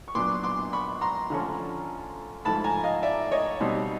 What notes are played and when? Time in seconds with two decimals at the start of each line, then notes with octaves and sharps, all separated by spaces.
0.08 C#6
0.15 A#2 F#3 B3 D4 C6 D6
0.43 C6 D6
0.73 B5 C#6
1.01 A#5 C6
1.30 D3 F3 A3 C#4
2.45 G#2 F3 A3 A5 B5
2.64 G#5 A#5
2.84 D#5 F5
3.03 D5 E5
3.31 C#5 D#5
3.60 B2 G3 C4 D#4